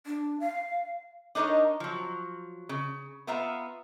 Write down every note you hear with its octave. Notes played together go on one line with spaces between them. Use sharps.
D4
F5
D4 D#4 A#4 C#5 D#5
F3 F#3
C#3
B3 F4 E5 F5 A#5